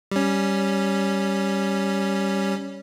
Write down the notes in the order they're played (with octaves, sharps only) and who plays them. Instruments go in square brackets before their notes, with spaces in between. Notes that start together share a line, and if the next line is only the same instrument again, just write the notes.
[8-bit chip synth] G3 C#4